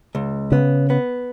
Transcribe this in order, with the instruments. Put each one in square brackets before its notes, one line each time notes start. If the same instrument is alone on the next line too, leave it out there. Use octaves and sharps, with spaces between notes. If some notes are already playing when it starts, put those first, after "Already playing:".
[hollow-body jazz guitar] C#2
[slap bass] C#3 [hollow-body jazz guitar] B3
[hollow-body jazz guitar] B3